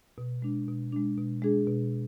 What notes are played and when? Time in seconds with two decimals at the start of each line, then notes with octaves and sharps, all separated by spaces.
0.18 B2
0.42 G#3 D4
0.68 B2
0.92 G#3 D4
1.18 B2
1.42 G#3 D4 G#4
1.67 B2